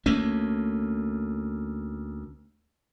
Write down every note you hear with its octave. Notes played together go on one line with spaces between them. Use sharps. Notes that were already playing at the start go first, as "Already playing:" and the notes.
D2 A3 A#3 C#4